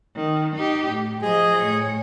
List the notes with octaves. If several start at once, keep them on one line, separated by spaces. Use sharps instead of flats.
D#3
D#4 G4
A2
F3 G#4 D#5
A2 C#5